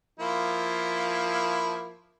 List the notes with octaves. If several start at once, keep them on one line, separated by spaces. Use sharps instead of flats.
F3 A#3 E4